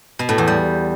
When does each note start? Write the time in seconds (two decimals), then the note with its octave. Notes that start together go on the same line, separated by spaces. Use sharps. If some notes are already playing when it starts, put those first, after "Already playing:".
0.19 B2
0.29 A2
0.38 E2
0.48 G3